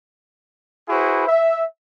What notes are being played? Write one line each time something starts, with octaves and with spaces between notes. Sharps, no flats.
E4 F#4 G#4 B4 C5
E5